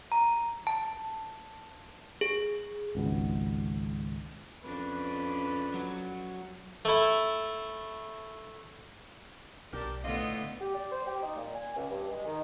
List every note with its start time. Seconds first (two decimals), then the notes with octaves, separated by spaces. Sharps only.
0.12 A#5
0.67 A5
2.21 G#4
2.95 G#1 C#2 B2
4.63 F2 C#4 D4 B4
5.74 F#3
6.85 A3 E4
9.73 B1 D4 G4 A#4
10.04 A2 D3 B3 F4 D#5
10.61 G4
10.75 D5
10.92 C5
11.07 G4
11.23 D#4
11.36 A#2
11.55 G#5
11.76 C#2
11.91 G2
12.11 G#3
12.26 D#3